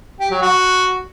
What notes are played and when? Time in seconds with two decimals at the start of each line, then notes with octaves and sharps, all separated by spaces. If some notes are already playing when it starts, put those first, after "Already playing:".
0.20 G4
0.31 F#3
0.42 F#4